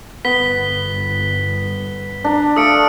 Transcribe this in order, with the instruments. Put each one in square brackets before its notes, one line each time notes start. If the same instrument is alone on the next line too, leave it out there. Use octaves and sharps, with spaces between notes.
[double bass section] G1 [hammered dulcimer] B3 [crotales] B6 G7
[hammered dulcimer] D4 A#5
[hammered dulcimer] A3 F5 [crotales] D#6 C#7 D7